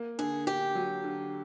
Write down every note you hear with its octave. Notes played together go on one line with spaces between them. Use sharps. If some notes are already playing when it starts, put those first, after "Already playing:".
Already playing: A#3
D3 G#4
D3 G4
F#3
D3